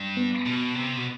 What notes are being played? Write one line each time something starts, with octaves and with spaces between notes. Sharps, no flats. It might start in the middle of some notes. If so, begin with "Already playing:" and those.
Already playing: G2
B3
B2
C3
B2